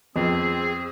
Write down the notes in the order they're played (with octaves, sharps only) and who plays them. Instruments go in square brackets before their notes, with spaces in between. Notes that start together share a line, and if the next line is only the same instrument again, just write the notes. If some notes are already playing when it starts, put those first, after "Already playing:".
[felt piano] F2 [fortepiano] F3 B3 [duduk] C4 [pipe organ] G#4